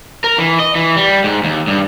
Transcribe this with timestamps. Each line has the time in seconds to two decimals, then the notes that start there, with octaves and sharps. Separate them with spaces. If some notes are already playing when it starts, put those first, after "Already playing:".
0.24 A#4
0.38 E3
0.60 D#5
0.75 E3
0.96 G3
1.24 G#2
1.44 D#2
1.67 G2